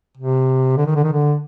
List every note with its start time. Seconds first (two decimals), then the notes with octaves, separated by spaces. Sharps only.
0.17 C3
0.77 D3
0.86 D#3
0.95 D3
1.04 D#3
1.12 D3